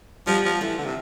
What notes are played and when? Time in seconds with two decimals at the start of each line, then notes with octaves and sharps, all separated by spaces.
0.27 F3 G3 B3
0.45 F3
0.61 E3 F3 A3
0.78 D3
0.86 C3